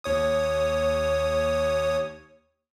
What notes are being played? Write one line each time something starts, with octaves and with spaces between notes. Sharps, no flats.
D#2 C#5 D#6